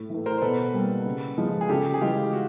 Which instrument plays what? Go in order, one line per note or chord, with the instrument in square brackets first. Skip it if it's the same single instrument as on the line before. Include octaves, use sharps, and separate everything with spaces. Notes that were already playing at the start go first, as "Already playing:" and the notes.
Already playing: [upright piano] A2
E3 A3
[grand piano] A#4 C5
C5
[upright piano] B2 [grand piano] A4 B4
[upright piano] G3 A#3
C#3
F3 G#3
[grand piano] G#4
[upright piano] C#3 [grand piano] G4 A4
[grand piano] G#4
[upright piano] E3 G#3 [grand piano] F4 G4
[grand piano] F#4